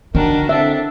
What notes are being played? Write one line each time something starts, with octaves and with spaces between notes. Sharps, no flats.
D3 D#3 D4 F#4 A#4
C4 D4 A4 E5